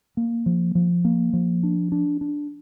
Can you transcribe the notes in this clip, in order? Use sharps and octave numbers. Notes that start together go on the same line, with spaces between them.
A#3
F3
F3
A#3
F3
D4
D4
D4